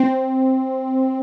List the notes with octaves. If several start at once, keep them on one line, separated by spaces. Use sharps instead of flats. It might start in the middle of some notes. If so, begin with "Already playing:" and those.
Already playing: C4